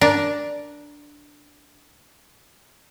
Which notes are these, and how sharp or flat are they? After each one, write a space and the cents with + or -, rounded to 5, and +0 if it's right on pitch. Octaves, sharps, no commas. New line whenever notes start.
D4 +0 A#4 +15